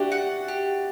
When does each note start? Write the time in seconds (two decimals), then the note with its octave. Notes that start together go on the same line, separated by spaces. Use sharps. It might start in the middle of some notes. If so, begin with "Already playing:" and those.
Already playing: D4 E4 F#4 G4
0.12 F#5
0.48 G4